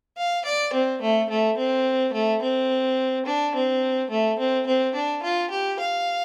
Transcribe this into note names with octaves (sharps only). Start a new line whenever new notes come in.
F5
D5
C4
A3
A3
C4
A3
C4
D4
C4
A3
C4
C4
D4
F4
G4
F5